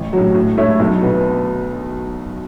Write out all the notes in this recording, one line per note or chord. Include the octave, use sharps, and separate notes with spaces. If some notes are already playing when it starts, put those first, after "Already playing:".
Already playing: A1
A2 F#3
A2
A3 E4 C#5 E5
B1
B2 B3